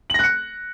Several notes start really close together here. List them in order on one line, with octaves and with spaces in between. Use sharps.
F#7 A#6 F#6 C#7